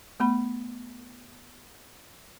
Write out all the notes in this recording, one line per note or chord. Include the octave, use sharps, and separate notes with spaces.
A3 B3 B5